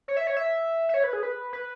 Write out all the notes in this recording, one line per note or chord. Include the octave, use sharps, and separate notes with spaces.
C#5
E5
C#5
E5
E5
C#5
B4
G#4
B4
B4